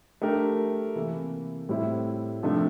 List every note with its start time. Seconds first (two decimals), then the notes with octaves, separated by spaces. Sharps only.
0.22 A3 D4 G4 A#4
0.95 C3 E3 A#3 E4 A4
1.69 A2 G3 C4 E4
2.43 C3 F3 A3 D4